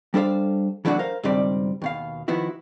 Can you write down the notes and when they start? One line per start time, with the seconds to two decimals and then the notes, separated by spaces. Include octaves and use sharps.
0.14 G3 D4 A4 C5 F5
0.85 E3 F#3 A3 D4 F#4
0.99 A#4 C5 F5
1.23 C#2 G2 D#3 G3 C4 D5
1.82 D#2 B2 F5
2.28 D#3 F3 B3 E4 F#4